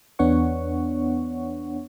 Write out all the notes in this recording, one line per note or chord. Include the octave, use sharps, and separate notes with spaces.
E2 B3 D4 C#5 F#5 C#6